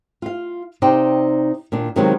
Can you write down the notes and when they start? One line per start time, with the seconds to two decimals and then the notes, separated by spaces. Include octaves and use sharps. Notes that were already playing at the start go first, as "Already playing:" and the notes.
0.22 F4 F5
0.82 C3 D#4 C5 D5 G5
1.72 A#2 D#3 D4
1.96 C3 D#3 F3 F#3 G#3 B3